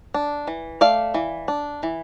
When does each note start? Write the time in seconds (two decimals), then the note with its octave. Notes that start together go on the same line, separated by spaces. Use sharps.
0.14 D4
0.47 E3
0.81 A3 D5 F5
1.14 E3
1.48 D4
1.83 E3